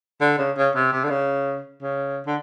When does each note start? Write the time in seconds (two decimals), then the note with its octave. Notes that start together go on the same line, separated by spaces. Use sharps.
0.21 D3
0.38 C#3
0.57 C#3
0.75 C3
0.92 C3
1.04 D3
1.10 C#3
1.82 C#3
2.26 D3